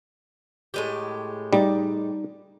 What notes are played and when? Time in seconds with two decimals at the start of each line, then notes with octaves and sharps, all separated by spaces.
0.74 A2 G#3 G4
1.53 G3 D#4 D5